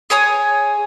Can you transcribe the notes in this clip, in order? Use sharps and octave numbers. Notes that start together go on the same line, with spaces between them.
G#4 C#5 G#5 D#6